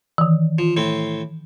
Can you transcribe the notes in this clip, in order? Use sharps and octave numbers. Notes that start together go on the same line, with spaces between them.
D#3 E3
F3
A2 C4